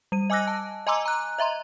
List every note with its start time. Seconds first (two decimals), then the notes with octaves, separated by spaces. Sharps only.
0.12 G3 D#7
0.30 D#5 G#5 D6 E6 F#6 A#6
0.47 A5
0.87 D#5 G#5 A#5 C6 D6 E6
1.06 A#5 F#6
1.39 D#5 E5 A#5 C6